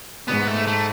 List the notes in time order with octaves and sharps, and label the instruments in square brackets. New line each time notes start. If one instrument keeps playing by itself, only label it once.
[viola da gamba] G#2 [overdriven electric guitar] B3
[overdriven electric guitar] A3
A3